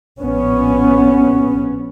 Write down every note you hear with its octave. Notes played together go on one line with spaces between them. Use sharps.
A#1 B3 C#4